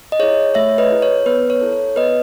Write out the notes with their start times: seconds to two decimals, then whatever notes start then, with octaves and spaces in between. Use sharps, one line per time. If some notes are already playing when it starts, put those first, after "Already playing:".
0.12 D#5
0.19 E4 G#4 C#5
0.54 A3 C#5 E5
0.78 B4 D#5
0.90 E4 G#4
1.02 C#5
1.26 B3 B4
1.50 C#5
1.61 E4 A4
1.73 C#5
1.96 B3 B4 D#5